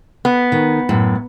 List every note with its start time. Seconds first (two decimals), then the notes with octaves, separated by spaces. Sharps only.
0.25 B3
0.52 D#3
0.89 F#2 A2